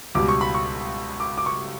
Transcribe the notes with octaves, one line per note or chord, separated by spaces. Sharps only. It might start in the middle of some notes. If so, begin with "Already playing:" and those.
C#2 B2 G3 D6
C#6
B5
C#6
D6
D6
C#6